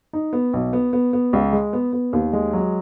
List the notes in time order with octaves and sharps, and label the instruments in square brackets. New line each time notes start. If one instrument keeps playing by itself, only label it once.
[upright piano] D#4
B3
B1
B3
B3
B3
C#2
G#3
B3
B3
D#2
G#3
F#3